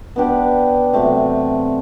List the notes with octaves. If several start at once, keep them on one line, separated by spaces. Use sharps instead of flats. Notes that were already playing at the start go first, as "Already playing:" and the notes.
B3 D4 G4 D5
C3 F#3 A3 C4